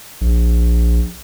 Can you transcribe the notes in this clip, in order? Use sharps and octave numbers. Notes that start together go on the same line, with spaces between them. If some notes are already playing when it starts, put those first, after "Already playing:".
A#1